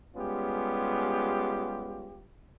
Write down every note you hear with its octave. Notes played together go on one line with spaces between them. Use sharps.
G3 G#3 B3 C#4 F4 G4